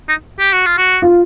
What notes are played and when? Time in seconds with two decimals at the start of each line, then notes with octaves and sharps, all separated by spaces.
0.09 D#4
0.40 G4
0.53 F#4
0.66 F4
0.78 F#4
1.02 F4